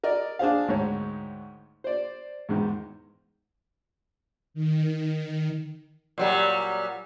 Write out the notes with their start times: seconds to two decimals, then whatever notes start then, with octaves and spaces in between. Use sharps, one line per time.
0.03 A#4 D5 D#5
0.39 D4 G#4 C5 F5
0.68 D2 G#2 D#3 C#5
1.84 C5 D5
2.49 E2 G#2 D#3
4.54 D#3
6.18 A#2 F#3 G3